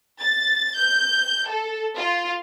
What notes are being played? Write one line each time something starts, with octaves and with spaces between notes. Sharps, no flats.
A6
G6
A4
F4